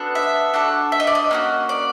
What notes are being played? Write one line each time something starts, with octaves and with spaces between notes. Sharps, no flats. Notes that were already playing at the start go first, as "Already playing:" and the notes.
Already playing: B3 D4 F#4 A4
E5
D4 F#4 A4
E5
D#5
D5
D#5
A#3 C#4 F#4
D5